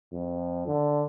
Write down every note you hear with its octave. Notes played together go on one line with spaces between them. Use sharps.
F2
D3